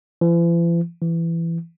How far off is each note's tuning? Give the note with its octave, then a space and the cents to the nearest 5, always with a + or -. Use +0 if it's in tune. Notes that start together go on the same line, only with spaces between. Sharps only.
E3 +45
E3 +15